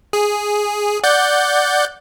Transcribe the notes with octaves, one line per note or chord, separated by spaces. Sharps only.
G#4
D5 F#5 G6